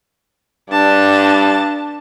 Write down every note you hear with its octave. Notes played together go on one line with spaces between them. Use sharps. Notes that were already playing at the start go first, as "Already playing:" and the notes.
G2 D4 A5